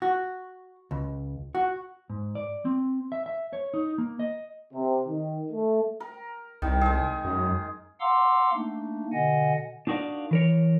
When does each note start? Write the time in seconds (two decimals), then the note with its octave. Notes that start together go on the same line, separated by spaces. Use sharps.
0.02 F#4
0.91 C#2
1.55 F#4
2.10 G#2
2.35 D5
2.65 C4
3.12 E5
3.26 E5
3.53 C#5
3.74 D#4
3.98 A#3
4.19 D#5
4.74 C3
5.08 D#3
5.52 A3
6.00 A#4
6.62 C2 D#3
6.81 G#3 G#4
7.25 F#2
8.01 F5 F#5 A#5 C6 D6 E6
8.54 A3 A#3 D4 D#4
9.13 B2 D3 D#5 F#5 G#5
9.87 D4 D#4 F#4 A#4 D5 F5
10.31 E3 A#4 C#5